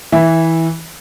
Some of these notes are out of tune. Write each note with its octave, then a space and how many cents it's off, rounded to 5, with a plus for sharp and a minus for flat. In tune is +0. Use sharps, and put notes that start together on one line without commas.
E3 -15 E5 +0